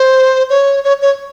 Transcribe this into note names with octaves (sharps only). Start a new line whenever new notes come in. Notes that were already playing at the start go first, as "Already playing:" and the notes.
Already playing: C5
C#5
C#5
C#5